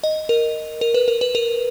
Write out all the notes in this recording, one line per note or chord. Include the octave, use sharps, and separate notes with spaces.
D#5
A#4
A#4
B4
A#4
B4
A#4